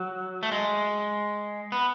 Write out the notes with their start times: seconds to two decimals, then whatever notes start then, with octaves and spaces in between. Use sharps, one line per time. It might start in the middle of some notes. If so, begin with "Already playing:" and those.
Already playing: F#3
0.43 A3
0.52 G#3
1.72 B3